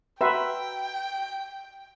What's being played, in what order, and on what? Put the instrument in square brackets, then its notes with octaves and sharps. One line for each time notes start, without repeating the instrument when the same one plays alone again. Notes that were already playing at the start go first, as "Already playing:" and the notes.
[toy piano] F#4 F#5 A#5 [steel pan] B4 E5 [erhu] G5